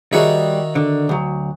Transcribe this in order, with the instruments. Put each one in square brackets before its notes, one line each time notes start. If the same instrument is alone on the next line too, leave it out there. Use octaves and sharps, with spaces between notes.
[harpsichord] D#3 F#4 E5 [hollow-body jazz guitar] G3 G#4 C#5
[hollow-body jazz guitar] D3
D2 F#3